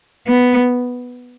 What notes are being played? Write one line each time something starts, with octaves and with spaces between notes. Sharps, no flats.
B3